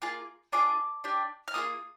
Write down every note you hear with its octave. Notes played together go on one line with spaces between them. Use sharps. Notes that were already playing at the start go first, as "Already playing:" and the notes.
A#3 F4 G#4
D4 F4 G#4 D6
D4 G4
F6
A#3 F4 G#4 D#6